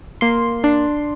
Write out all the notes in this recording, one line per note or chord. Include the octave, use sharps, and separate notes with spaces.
A#3 C6
D4